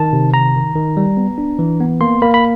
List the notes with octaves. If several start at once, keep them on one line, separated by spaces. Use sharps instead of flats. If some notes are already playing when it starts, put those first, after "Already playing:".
Already playing: D#3 A5
C3
D#3 A#5
D#3
D#3
G3
B3
D4
E3
B3
A#3 C6
A#3 B5
B5